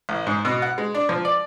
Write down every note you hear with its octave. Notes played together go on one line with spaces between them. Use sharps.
A1
G#2
B2
F#5
G#3
D4
F3
D5